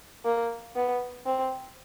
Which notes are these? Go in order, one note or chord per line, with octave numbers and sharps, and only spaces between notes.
A#3
B3
C4